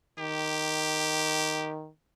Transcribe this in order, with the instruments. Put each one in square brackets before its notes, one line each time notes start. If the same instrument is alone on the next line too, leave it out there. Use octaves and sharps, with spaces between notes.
[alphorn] D#3 [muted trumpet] G4